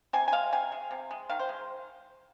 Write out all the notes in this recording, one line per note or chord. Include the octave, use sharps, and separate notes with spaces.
C3 G#5
G#5
G#3 F5
C3 G#5
G#3
C3
G#3
D#3 F5
C5
G#3